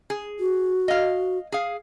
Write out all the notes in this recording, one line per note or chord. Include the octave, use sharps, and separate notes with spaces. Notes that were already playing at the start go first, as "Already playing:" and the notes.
G#4
F#4
D#5 F5
G#4 F5